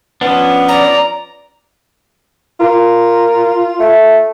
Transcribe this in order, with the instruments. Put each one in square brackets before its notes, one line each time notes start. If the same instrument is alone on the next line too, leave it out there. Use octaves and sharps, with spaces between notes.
[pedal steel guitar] F3 C#4 D4 [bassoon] B3
[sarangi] D5 [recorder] A#5
[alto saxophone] F4 [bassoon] A#4
[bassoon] A3